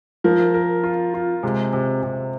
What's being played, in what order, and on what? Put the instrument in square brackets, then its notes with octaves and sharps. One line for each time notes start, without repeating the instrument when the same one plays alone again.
[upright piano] F3 [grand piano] A#4
[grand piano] A#4
F4
F4
[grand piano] C3 [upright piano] G#3
[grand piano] C3
C3